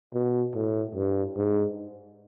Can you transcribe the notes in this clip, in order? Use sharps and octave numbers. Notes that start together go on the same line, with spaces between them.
B2
A2
G2
G#2